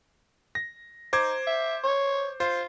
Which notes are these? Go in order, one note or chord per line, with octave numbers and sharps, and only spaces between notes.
A#6
D#4 C5 D6 G#6
E5
C#5
F4 C5